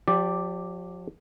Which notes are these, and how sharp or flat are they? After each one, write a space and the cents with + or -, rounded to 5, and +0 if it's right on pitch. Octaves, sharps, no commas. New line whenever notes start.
F3 +40 G4 +0 D5 +0